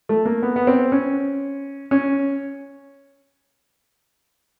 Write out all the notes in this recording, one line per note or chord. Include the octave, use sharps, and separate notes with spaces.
A3
A#3
B3
B3
C4
C#4
C#4